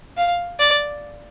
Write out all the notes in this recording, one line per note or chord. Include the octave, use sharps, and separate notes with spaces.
F5
D5